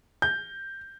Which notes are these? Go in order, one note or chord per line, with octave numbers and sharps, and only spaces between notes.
G6